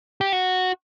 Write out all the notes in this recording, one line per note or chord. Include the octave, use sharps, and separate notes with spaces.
G4
F#4